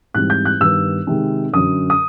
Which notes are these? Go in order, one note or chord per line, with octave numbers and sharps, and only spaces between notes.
G#2 E3 G3 C4 F#6
G6
F#6
G2 D#3 G3 B3 E6
C3 D#3 G#3 C4 D#4
F#2 D3 F#3 D#6
D#6